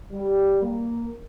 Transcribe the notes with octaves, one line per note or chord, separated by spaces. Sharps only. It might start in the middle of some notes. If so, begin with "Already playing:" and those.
G3
A#3